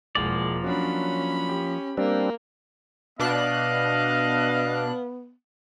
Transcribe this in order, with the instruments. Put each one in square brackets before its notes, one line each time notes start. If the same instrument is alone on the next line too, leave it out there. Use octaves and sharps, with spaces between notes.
[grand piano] E1 E2 G#3 [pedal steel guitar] F3 A#3 D5
[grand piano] F#3 D4 F#4 [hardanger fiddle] C#4 B5
[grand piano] G4
[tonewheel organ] G3 C4 D4 [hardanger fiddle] A#3
[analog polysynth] B2 D4 F#6 [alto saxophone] B3 [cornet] D#5 [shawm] F5